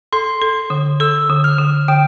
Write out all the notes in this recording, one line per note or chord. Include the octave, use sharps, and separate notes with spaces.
A4 C6
A4
D3
A4 E6
D3
F6
D3
D3 G5